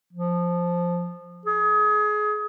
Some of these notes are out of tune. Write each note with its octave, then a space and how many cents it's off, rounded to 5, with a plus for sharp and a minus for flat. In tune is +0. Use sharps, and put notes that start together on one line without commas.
F3 +0
G#4 +25